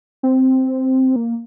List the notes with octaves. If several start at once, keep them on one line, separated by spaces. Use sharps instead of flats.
C4
A#3